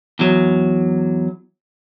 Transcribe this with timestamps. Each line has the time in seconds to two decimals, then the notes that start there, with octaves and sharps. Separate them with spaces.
0.19 E2 F#3